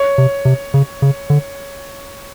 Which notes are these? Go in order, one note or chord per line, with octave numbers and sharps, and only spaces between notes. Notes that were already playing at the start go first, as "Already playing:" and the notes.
Already playing: C#5
C3
C3
C#3
C#3
D3